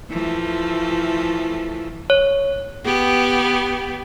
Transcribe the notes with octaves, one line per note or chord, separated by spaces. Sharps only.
E3 F3 A3
C#5
B3 G4